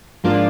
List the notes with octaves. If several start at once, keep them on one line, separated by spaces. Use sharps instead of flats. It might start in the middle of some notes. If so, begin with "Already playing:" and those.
G#2 F3 A#3 D4 F4